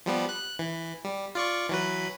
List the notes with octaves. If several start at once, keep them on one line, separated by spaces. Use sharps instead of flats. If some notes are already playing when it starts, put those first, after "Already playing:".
F3 G3 B3
F#6
E3
G3
F4 D5 C#6
E3 F#3 B4